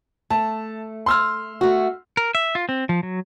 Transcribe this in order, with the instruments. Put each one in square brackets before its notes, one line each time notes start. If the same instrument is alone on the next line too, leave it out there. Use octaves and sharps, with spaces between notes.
[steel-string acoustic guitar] A3 [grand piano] A5
[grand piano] C6 E6 F6
[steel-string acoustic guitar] A3 F#4
[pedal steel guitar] A#4
E5
F4
C4
F3
F#3